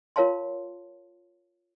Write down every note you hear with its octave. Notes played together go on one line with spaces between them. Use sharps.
F4 A#4 C#5 F5 A5 C6